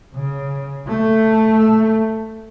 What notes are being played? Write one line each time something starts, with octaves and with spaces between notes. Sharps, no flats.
C#3
A3